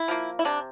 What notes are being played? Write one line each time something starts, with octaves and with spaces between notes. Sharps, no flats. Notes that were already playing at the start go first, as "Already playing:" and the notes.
Already playing: E4
F3 A#3
E4
C3 D4